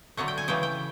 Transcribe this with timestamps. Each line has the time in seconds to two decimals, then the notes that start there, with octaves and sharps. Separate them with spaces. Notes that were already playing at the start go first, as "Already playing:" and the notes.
0.17 D3 F#3 A3 F#5
0.28 G5
0.38 G#5
0.48 C#3 E3 A3 G5
0.63 G5